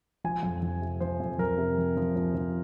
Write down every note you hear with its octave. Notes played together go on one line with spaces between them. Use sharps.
F3 G#5
F2
F3
C3
F3 C5
F2
F2 A#4
C3
F3
F3
F3
F3